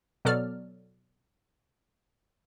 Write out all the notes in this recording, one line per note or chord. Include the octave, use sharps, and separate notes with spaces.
B2 F#3 B3 A4 D5 F6